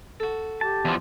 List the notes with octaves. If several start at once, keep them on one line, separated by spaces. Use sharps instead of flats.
F#4 A4
G4 A5
E2 F3